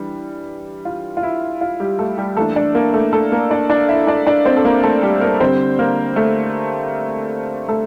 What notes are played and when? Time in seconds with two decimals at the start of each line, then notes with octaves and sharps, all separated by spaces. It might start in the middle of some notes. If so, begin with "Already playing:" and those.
Already playing: E3 G3 D4
0.85 F4
1.17 F4
1.23 E4
1.61 F4
1.80 G3 G4
1.99 A3 A4
2.18 G3 G4
2.36 E3 A3 A#3 D4 A4
2.56 D4 D5
2.75 A#3 A#4
2.94 A3 A4
3.13 A3 A4
3.32 A#3 A#4
3.51 D4 D5
3.70 D4 D5
3.89 E4 E5
4.07 D4 D5
4.27 D4 D5
4.45 C4 C5
4.57 A4
4.65 A#3 A#4
4.83 A3 A4
5.02 G3 G4
5.21 A#3 A#4
5.40 D3 G3 C4 C5
5.79 A#3 A#4
6.16 A3 A4
7.69 A3 A4